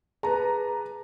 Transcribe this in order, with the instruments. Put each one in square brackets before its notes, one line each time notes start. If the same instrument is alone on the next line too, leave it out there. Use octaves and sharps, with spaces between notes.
[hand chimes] G#4 A5 [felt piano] B4 A#5